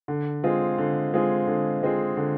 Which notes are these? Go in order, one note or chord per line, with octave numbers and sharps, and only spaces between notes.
D3
G#3 C4 F4 G#4
D3
G#3 C4 F4 G#4
D3
G#3 C4 F4 G#4
D3